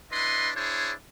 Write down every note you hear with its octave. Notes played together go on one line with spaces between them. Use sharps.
D4 E4 B4 D#5 C6
D4 E4 G#4 C5 C#5